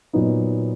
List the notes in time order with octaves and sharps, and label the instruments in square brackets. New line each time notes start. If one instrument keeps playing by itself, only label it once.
[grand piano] A#2 F#3 B3 D#4